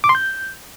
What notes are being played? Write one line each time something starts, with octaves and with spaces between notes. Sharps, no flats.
D6
C6
G6